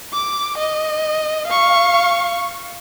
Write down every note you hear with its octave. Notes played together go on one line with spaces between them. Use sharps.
D6
D#5
F5 C#6